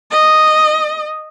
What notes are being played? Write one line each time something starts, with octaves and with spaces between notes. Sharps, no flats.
D#5